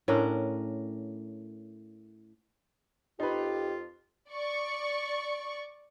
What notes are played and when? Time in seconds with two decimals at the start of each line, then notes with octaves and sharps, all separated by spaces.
0.08 A2 C#4 D4 A#4
3.20 F2 D#4 F4 G4 B4
4.30 D5 C#6